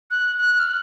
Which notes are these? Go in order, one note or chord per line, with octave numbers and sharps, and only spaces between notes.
F#6
F#6
F6
F#6